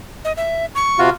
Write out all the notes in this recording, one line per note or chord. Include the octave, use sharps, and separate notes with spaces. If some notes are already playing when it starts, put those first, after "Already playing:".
D#5
E5
C#6
C3 F4 F#4